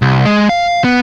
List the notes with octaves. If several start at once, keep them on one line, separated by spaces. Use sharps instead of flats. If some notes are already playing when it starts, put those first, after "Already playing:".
C2
G#3
F5
B3